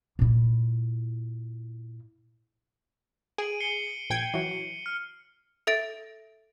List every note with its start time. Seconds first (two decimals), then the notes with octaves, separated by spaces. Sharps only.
0.19 A#2 E4
3.38 G#4 D7 D#7 F#7
3.60 C7 C#7 G7
4.10 A#1 G5 G#6
4.34 E3 F#3 C#7
4.86 F6
5.67 A4 E5 A6 D7